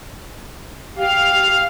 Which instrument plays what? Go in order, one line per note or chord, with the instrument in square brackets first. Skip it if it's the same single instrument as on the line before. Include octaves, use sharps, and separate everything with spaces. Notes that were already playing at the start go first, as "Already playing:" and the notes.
[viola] G4 [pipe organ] F5